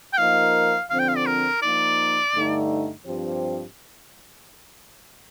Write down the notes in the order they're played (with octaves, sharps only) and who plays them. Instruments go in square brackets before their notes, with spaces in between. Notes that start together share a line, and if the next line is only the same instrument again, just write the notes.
[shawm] G5
[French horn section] F3 A#3 D#4 A#4 [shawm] F5
[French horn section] D3 F3 C4 [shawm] F5
[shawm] G5
F5
D5
A#4
[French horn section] F3 A#3 D#4 [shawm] D5
[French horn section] G2 D3 A3 D#4
G2 F3 C4 G4 C5